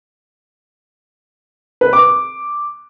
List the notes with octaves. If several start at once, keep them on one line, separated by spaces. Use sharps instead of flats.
B4
D6